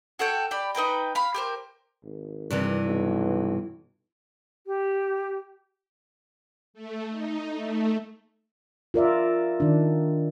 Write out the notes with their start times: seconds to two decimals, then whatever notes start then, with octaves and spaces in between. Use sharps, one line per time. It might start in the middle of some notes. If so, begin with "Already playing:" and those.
0.19 F#4 A4 C#5 G5
0.51 G4 D5 B5
0.75 D#4 B4 G5 A#5
1.15 F5 B5
1.34 G4 A#4 C5
2.04 G#1
2.51 G2 C3 E3
2.85 B1
4.67 G4
6.74 A3
7.09 D#4
7.53 A3
8.94 F4 A#4 D5 E5
9.60 D#3 D4